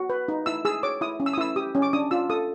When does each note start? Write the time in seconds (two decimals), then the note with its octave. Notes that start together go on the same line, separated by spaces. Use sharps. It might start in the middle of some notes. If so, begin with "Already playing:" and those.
Already playing: F#4
0.10 B4
0.28 D#4
0.46 E4 E6
0.65 G#4 E6
0.83 C#5 D6
1.01 E4 D#6
1.20 C#4
1.26 E6
1.33 D#6
1.38 E4 E6
1.56 G4 D#6
1.75 C#4
1.82 D6
1.93 D4 D#6
2.11 F4 E6
2.30 A4 D#6